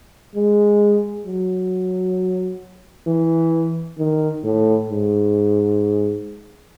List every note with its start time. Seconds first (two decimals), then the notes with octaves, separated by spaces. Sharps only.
0.35 G#3
1.26 F#3
3.07 E3
3.98 D#3
4.44 A2
4.89 G#2